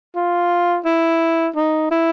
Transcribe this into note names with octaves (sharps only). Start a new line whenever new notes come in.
F4
E4
D#4
E4